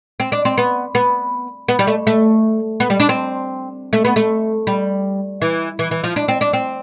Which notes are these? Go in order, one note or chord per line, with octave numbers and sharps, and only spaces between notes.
C4
D4
C4
B3
B3
B3
G3
A3
A3
B3
G3
D4
C4
A3
B3
A3
G3
E3
E3
E3
F3
D4
C4
D4
C4